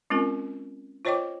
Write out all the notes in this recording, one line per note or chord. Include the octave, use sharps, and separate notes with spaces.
G#3 C4 C#4 F4 A#4
F4 C5 C#5 D#5 G5 D6